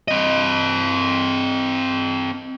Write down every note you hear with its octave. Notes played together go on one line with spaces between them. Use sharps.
C4 D#5